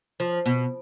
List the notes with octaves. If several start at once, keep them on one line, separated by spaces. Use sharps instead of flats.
F3
B2